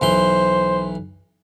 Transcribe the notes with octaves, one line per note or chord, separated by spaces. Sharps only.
B1 E3 C5 C6